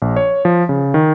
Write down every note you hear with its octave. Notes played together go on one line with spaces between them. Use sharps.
A#1
C#5
F3
C#3
D#3